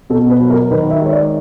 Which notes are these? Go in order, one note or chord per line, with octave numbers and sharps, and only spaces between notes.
B2 A4
B4
F#3
A#4
D#3 B4
E5
G#3 C#5
D5